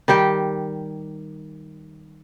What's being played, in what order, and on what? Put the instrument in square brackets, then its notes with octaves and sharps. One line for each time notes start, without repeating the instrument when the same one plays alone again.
[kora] D#3 G3 G4 G5